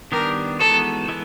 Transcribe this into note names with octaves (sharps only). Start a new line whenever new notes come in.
D#3 G3 B3 D4 G4 A#4
E3 G#3 B3 D#4 F#4 A4
E3 G#3 B3